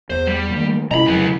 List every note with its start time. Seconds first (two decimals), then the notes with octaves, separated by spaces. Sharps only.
0.10 E2 C5
0.27 G3
0.50 D#3 A3 A#3
0.91 C3 G#3 C#4 E4 D#5 A#5 B5
1.07 F2 C#3 F#3 B4